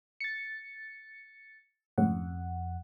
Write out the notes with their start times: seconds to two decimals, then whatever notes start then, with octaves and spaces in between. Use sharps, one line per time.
0.21 A6 C#7
1.98 F2 G#2 C#3 A3 F#5